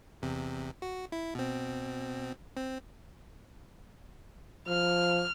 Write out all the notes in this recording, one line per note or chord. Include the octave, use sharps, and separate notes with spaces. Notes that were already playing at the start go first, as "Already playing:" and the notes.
E2 C3
F#4
E4
B2 C4
C4
F3 F6